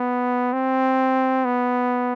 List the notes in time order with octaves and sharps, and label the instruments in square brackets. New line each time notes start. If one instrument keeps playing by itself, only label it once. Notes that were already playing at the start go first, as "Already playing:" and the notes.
Already playing: [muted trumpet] B3
C4
B3